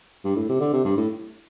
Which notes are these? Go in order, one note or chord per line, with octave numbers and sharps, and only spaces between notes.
G2
A2
C3
D3
C3
G2
A2